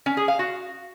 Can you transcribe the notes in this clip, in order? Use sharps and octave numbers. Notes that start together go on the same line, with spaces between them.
C#4
G#4
F5
F#4